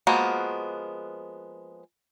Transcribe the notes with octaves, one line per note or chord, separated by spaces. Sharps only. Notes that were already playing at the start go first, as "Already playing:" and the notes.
F3 G#3 A#3 B3 F#4